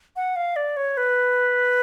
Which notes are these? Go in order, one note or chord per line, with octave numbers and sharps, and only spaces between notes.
F#5
F5
D5
C#5
B4